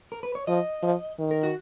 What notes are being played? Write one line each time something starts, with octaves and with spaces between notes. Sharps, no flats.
A#4
B4
C#5
F3 D#5
F3
D#3
A#4
F#4